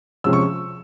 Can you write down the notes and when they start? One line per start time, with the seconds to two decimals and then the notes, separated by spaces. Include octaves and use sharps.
0.24 C3 F3 G#3 C#4 E6
0.33 C#6